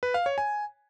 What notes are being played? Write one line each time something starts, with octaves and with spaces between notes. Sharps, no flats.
B4
F5
C#5
G#5